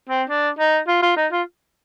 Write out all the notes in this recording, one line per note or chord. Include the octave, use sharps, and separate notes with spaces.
C4
D4
D#4
F4
F4
D#4
F4